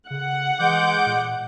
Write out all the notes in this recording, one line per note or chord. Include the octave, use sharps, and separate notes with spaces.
C#3 F#5
E3 G#3 D6 G6
A#2